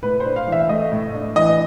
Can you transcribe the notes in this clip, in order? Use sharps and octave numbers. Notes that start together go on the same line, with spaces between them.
A2 B4
C5
D4
F5
E3
E5
A3 D#5
A2
D4
E3 D#5